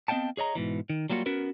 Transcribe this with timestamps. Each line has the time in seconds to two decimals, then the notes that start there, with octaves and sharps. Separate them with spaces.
0.08 B3 C4 D#5 F5 G5 A5
0.37 G#4 C#5 D#5 A#5
0.55 G#2 B2 E3
0.90 D#3
1.10 F#3 G3 A#3 F4 F#4
1.26 B3 C#4 F#4 A#4 B4